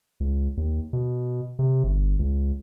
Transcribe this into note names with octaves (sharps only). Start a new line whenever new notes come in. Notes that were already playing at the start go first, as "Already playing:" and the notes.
C#2
D#2
B2
C3
G1
C#2